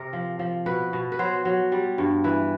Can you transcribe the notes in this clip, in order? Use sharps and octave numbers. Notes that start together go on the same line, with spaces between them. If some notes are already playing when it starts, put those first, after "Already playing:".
Already playing: C3 A#4
F3
F3
B2 B4
B2
B4
F#3 C5
F#3
G3
G2
E3 B4